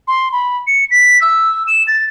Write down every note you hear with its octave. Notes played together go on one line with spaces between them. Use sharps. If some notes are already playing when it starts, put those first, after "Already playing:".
C6
B5
C#7
B6
E6
E7
A6